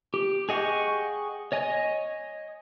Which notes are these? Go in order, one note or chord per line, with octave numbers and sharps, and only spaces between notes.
G4
G#4 D#5 F#5 G5 C#6
C#5 D#5 G#5